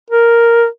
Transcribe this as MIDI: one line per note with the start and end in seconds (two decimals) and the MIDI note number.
0.10 0.66 70